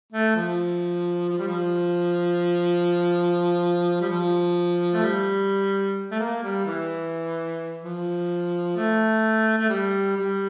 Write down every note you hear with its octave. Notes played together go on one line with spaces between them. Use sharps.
A3
F3
F3
G3
F3
G3
F3
A3
G3
A3
A#3
G3
E3
F3
A3
A3
G3
G3